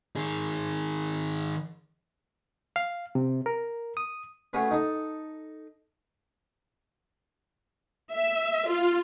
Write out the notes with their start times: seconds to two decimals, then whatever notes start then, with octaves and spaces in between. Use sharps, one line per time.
0.16 D#3 G#4
2.76 F5
3.15 C3
3.46 A#4
3.97 D#6
4.53 A3 C#4 F#4 G#4 B4
4.71 D#4 A4 D#5
8.15 E5
8.70 F4